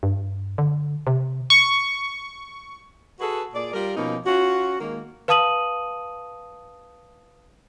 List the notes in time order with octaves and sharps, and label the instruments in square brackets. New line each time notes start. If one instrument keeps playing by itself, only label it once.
[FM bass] G2
D3
C3
[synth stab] C#6
[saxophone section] F#4 G#4 A4 B4
A#2 G#4 D5
G3 F4 A#4
B2 F3 A#3 C#4 D#4
C#4 F4 F#4
D#3 G#3 A#3
[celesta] B4 F5 A5 D#6 D#7 F#7